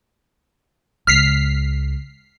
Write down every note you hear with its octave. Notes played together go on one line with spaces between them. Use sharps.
C#2 F6 B6 C7